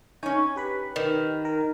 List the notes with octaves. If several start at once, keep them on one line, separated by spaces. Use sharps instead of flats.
C#4 D#4 C#5 G#5
G4 B4 B5
D#3
A#4